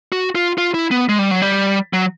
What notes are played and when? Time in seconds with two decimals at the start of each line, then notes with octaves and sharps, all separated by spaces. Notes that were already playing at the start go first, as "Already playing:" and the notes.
0.12 F#4
0.35 F4
0.58 F4
0.74 E4
0.91 B3
1.09 G#3
1.19 G3
1.31 F#3
1.42 G3
1.93 F#3